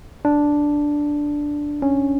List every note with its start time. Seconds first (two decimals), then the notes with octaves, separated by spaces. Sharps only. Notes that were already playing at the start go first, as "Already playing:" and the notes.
0.25 D4
1.82 C#4